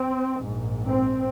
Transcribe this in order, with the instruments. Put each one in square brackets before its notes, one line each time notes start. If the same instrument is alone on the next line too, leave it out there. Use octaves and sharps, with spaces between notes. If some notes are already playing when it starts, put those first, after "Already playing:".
Already playing: [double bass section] C4
A#1 G#2
C4